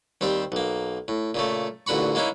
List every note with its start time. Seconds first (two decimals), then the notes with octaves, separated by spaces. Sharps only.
0.21 D#2 G3 C4 C5
0.52 B1 A#3
1.08 A2
1.34 A#2 C#3 A3
1.87 A1 A#2 D3 F#4 B5 C#6
2.15 G#3 A#3 C#4 D#4 E4